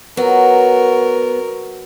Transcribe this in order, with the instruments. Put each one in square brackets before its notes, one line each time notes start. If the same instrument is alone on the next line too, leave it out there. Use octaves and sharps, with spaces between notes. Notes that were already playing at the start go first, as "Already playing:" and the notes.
[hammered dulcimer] F#3 [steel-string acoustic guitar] B3 [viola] A#4